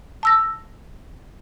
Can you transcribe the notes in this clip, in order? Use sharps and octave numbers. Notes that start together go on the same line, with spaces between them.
A5 E6 A#6